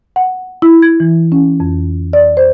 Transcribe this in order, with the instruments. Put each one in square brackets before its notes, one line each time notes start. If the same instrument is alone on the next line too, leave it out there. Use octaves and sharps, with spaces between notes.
[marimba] F#5
E4
G#6
E3
C#4
F2
D5
C5